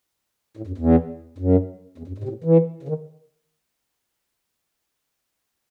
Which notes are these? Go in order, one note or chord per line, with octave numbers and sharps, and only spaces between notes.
A2
F#2
E2
F#2
E2
F#2
G#2
C3
A2
E3
C#3
D#3